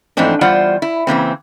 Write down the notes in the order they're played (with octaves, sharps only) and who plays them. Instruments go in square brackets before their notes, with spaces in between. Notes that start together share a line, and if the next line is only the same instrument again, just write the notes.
[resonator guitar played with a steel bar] G#2 E3 F3 A3 C4 D4
E2 G3 F4 C5 D5 F#5
E4
C#3 E3 A#3 C4